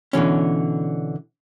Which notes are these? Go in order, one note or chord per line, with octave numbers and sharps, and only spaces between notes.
B2 D3 E3 C#4